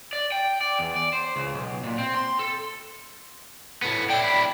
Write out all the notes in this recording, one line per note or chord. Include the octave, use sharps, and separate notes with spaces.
D5
G5
D5
E2
D5
C5
C#2
B1
A#2
C4
C6
A4
A2 B3
D4 E4 G5
B5